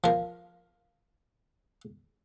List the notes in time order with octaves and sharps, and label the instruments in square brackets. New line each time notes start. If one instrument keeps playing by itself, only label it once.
[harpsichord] F3 A#4